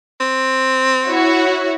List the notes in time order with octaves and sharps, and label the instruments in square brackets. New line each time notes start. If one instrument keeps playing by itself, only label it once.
[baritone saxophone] C4
[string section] E4 F#4 C#5